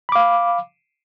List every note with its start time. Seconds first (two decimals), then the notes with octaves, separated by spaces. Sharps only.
0.09 B5
0.12 D6
0.16 F5